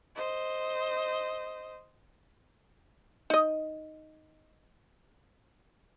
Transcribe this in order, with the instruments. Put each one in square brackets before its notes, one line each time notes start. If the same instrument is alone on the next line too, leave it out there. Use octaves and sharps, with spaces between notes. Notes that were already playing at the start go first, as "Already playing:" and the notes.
[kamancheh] C5 D#5
[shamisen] D#4 D#5